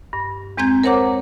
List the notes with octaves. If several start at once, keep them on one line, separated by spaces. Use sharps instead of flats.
G2
E2 G#3 C4 A#5 G6 G#6
A#4 C5 C#5 F#5 A#5 D6